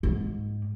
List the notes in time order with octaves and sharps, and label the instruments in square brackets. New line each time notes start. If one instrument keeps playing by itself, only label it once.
[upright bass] G#2